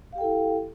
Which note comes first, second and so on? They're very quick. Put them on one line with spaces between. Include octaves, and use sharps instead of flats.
F5 G4 G5 A4 E4